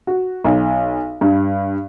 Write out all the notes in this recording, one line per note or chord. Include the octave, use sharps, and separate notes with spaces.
F#4
B1
G2